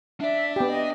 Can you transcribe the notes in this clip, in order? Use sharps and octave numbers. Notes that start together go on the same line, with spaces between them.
D4 D5 E5
B3 G4
D#5